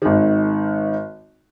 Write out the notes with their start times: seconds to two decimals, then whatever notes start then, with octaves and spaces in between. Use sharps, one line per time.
0.02 G#1 D#3